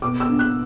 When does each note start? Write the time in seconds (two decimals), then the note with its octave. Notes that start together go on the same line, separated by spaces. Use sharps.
0.02 B2 D6
0.20 E6
0.29 D4
0.39 F#6